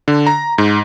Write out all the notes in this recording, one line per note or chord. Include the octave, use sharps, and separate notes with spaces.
D3
A#5
G#2